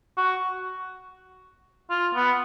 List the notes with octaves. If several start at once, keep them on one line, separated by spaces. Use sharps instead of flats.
F#4
F4
B3